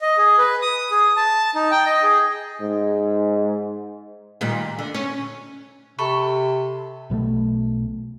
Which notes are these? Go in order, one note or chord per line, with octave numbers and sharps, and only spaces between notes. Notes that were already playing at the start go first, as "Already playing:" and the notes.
D#5
G#4
B4
D#6
G#4
A5
D#4
G5
D#5
G#4
G#2
A#2 D#3 G3
D3
C#4
C3 A4 B5 C#6
B1 B2 F3 A3